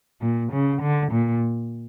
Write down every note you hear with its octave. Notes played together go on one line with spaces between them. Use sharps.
A#2
C#3
D3
A#2